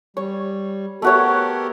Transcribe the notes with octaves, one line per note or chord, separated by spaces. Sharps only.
G3 C#5
A3 B3 F#4 G4 A#4 C#5